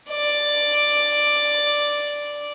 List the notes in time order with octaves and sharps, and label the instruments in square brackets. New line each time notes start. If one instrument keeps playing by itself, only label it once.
[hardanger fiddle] D5